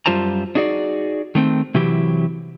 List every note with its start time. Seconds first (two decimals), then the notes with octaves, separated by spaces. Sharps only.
0.06 F#2 G3 F4 C5 A5 A#5
0.55 D4 D#4 F#4 G#4 D5
1.35 D#3 A3 C4
1.75 C3 E3 F#3 E4 G4